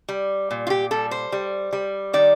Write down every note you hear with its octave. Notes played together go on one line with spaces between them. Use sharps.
G3
A#2
F4
G4
G3 A4
C5
G3
G3
D#3 D5